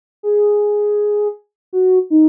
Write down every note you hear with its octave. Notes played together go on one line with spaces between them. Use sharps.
G#4
F#4
D#4